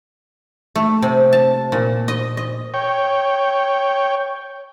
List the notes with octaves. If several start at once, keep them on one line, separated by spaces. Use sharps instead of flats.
A3
C3
A5
A#2
D#5
D#5
C#5 G5